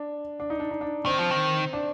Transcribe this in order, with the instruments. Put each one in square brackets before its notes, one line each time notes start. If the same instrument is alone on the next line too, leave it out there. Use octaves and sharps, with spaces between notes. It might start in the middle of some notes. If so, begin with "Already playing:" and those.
Already playing: [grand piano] D4
D4
D#4
D4
D#4
D4
[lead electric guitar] D#3 [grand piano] C4
[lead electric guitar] F3
D#3
[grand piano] D4